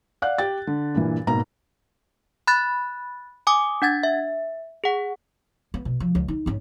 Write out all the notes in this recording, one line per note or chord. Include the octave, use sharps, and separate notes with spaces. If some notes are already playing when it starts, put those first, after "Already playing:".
D5 F5 F#5 F#6
G4 G5 A6
D3
G2 A#2 E3
G#1 B2 A#3 A#5
B5 F#6 A6
G#5 D6 D#6
D4 F#5 G#6 A6
E5
G#4 F#5
B3
B2
F3
C#2
D#4
G#1 C#4